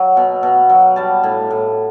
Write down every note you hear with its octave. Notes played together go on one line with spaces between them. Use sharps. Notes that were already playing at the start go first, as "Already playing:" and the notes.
Already playing: F#3
B2
B2
F#3
G3 A5
A2
A2